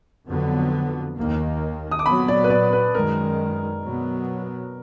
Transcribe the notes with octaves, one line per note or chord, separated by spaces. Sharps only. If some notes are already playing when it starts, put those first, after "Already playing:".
F2 D3 F#3 B3
D#2 D#3 A#3
D#6
D6
A#2 F#3 B3 B5
D5
B4
D5
B4
F#2 D#3 G#3 A#4
B2 F#3 B3